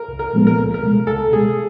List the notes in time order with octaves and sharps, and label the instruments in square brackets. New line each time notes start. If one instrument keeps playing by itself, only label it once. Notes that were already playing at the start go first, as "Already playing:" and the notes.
Already playing: [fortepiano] A#4
[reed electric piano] C2
[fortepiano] A#4
[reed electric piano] A#2 F3 G#3 B3
[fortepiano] A#4
[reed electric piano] C#2
[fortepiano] A#4
[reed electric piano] B2 G#3
[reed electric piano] C#2 [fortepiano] A4
[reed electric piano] B2 G#3 [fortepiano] G#4